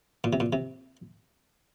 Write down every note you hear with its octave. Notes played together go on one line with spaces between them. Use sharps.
A#2
C3
A#2
C3